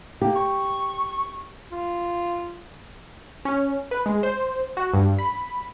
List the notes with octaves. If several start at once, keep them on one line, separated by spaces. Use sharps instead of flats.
A#3 G4
C#6
F4
C#4
B4
G#3
C5
F#4
G2
B5